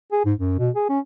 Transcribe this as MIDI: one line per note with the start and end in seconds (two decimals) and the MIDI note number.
0.12 0.22 68
0.25 0.34 44
0.39 0.54 42
0.59 0.70 47
0.75 0.86 68
0.89 0.99 61